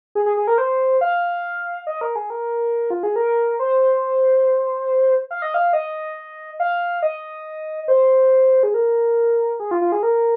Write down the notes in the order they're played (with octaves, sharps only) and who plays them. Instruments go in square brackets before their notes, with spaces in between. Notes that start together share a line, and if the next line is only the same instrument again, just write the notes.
[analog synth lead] G#4
G#4
G#4
A#4
C5
F5
D#5
A#4
G#4
A#4
F4
G#4
A#4
C5
F5
D#5
F5
D#5
F5
D#5
C5
G#4
A#4
G#4
F4
F4
G#4
A#4